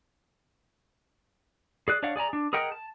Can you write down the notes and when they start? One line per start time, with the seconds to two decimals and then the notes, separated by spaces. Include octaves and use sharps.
1.88 G#4 D5 F#6
2.03 D4 C#5 D5 F5 F#5
2.16 G#4 D5 G#5 A#5
2.33 D4
2.53 G#4 A#4 D#5 F#5 G5
2.72 A5